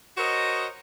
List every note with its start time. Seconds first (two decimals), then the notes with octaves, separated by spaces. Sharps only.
0.17 F#4 A#4 C5 C#5 D#5